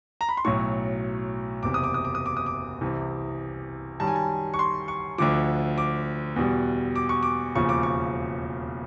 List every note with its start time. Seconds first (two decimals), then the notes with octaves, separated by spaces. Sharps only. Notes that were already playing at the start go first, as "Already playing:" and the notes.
0.21 A#5
0.29 B5
0.37 C6
0.45 B1 A2 F#3 C#6
1.63 F#1 E2 C3 D6
1.74 D#6
1.84 D6
1.94 D#6
2.05 D6
2.15 D#6
2.26 D6
2.37 D#6
2.46 D6
2.81 C2 C3 E3
4.00 F#2 D#3 G3 A5
4.07 G#5
4.16 A5
4.54 C#6
4.59 C6
4.88 C#6
5.18 D2 D3 F3 D6
5.78 D6
6.36 E2 B2 G3
6.95 D6
7.09 C#6
7.23 D6
7.55 E1 D#2 C#3 F3 C#6
7.69 D6
7.83 C#6